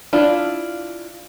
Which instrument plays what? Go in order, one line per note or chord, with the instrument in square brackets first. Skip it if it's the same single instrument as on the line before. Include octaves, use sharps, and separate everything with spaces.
[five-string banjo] D4 E4 F4